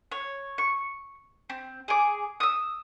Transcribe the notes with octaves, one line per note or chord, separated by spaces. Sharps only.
C#5
C#6
C4
G#4 D6
D#6 E6